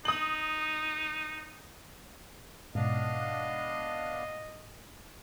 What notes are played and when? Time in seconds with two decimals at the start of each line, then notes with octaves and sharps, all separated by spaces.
0.05 D#4 D#6 F#7
2.75 G#2 B2 B3 D4 D#5 F5